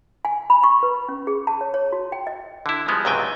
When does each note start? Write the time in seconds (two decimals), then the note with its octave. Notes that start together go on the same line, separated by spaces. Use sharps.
0.25 G#5
0.50 B5
0.64 C#6
0.83 B4
1.09 C#4
1.27 G#4
1.47 A5
1.61 C#5
1.74 C#5
1.92 F#4
2.12 G5
2.27 D#5
2.66 D3 E4
2.88 F3 G3 G#3 B3
3.05 C#2 G#2 C3 F#3 G5 G#5